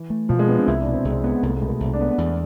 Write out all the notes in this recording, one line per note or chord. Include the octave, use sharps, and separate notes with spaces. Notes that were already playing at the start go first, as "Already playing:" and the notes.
Already playing: E3
A3
B2 F3
G#3
B3 D4
C4
C2 E4
D4
B2
C4
C2 G#3
G#3 B3
C2 A3
G#3
B2
A3
C2
D4
B3
E2